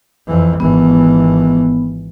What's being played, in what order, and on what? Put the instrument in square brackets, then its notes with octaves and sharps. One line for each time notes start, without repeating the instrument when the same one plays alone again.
[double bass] F2 E3
[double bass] G#1 E3 [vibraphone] B3